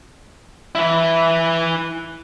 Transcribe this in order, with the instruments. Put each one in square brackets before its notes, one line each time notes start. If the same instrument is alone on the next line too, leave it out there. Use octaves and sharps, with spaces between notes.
[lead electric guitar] E4 B4